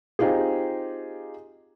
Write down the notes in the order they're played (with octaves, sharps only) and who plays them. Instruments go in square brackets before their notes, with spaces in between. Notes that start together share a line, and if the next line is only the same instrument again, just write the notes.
[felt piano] C4 D#4 F4 G4 G#4